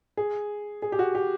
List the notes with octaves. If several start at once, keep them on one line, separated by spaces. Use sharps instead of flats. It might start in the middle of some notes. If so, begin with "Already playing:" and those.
G#4
G#4
G4
F#4
G4